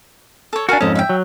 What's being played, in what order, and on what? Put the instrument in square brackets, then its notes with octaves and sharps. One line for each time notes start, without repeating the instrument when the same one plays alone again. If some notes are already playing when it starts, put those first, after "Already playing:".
[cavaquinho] A4 C#5
[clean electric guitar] D4 F#4 [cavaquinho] A#4 F5 G#5
[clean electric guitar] F2 G#2 C#4 [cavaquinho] A4 D#5
[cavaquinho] E5 F5 G5
[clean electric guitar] F#3